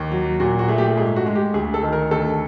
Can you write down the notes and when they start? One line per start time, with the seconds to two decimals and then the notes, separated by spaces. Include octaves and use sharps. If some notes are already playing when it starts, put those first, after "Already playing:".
Already playing: D#2
0.12 F#3
0.40 A#2 F#4
0.59 F#4
0.68 A3 G#4
0.78 G4
0.97 G#2 G#4
1.16 F#4
1.26 G#3
1.36 G4
1.54 D2 G#4
1.74 A4
1.82 D#3
1.93 A#4
2.11 D2 A4